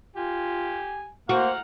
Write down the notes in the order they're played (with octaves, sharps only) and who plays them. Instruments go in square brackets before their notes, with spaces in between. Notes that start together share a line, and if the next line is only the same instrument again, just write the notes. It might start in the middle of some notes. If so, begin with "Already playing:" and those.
[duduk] F4 [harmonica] G4 G#5
[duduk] A#3 [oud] F#4 [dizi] C5 [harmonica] F#5 A#5 F6